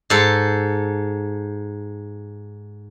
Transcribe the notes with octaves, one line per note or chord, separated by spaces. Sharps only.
G#2 A4